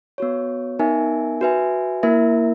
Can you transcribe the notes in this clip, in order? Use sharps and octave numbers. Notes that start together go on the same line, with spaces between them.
B3 F#4 C#5
B3 D#4 A#4 E5 G#5
F#4 B4 E5 G#5
A#3 E4 A#4 E5